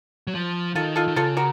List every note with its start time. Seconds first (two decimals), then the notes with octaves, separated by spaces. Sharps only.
0.27 F#3
0.35 F3
0.75 D#3 F4 A4
0.96 F4 A4
1.08 D#3
1.16 C#3 F4 A4
1.37 F#4 A#4